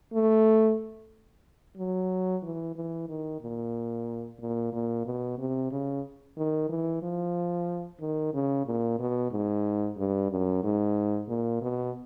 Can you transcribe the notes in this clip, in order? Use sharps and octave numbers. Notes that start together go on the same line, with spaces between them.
A3
F#3
E3
E3
D#3
A#2
A#2
A#2
B2
C3
C#3
D#3
E3
F3
D#3
C#3
A#2
B2
G#2
G2
F#2
G#2
A#2
B2